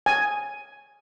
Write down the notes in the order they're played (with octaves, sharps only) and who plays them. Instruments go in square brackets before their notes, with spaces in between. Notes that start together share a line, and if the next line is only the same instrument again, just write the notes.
[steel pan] G#5